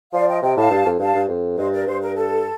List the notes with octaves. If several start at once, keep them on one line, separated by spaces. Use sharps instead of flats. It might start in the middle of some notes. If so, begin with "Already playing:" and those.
F3 D5 F5
D#5 G5
C3 D#5 G5
A2 F5 A5
G2
F2
G2 F5 A5
G2
F2
G2 C5 D#5
A#4 D5
G2 C5
A#4
A4